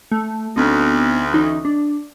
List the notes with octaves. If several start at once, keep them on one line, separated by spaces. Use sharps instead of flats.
A3
D2 B3 C4 D#4
E3 C#4 D#4
D4